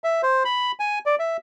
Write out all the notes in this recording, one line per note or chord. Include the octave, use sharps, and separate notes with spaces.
E5
C5
B5
G#5
D5
E5